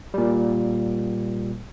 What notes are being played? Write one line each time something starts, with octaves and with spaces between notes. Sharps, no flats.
A#2 G3